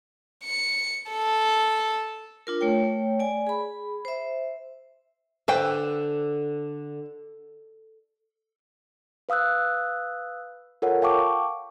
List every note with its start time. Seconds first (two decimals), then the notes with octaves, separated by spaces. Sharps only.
0.43 C#7
1.11 A4
2.47 D4 F4 A#4
2.61 A3 C#5 G5
3.20 D5 G#5
3.47 G#4 B5
4.05 C5 E5
5.48 D3 B4 C5 G5
9.29 B4 F5 D#6 E6 F#6
10.82 F4 A4 A#4 C#5 F#5
11.02 F5 G5 A5 C#6 D6